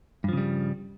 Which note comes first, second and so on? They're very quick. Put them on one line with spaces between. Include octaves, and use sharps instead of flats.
G2 F3 C#3 G3